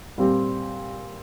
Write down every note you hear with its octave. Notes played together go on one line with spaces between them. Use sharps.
A#2 G3 C4 G4